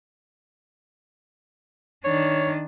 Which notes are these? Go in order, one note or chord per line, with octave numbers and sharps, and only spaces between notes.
D#3 D4 C#5